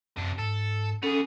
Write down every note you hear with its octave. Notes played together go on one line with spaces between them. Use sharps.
F#2 C3 D4
G#2 A4
B3 C#4 G#4 A4